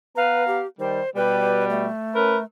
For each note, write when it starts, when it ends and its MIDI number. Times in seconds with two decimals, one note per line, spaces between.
0.16 0.60 59
0.16 0.46 71
0.16 0.60 77
0.16 0.60 82
0.47 0.67 67
0.80 1.01 51
0.80 1.01 55
0.80 1.10 72
1.16 1.88 47
1.16 1.88 55
1.16 1.65 71
1.70 2.44 57
2.15 2.37 61
2.15 2.37 70
2.15 2.37 71